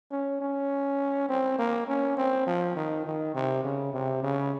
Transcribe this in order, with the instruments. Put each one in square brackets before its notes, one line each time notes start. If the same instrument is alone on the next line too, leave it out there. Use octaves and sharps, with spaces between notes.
[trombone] C#4
C#4
C4
A#3
C#4
C4
F3
D#3
D#3
C3
C#3
C3
C#3